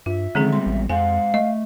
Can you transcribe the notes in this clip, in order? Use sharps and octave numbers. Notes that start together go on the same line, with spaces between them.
G2 F4 E5
D3 D#3 F3 G#3 C4 C#4 G#4
F#3 G3 B3 C6
A1
F2 G#3 C5 F5 F#5 G#5
A3 D#5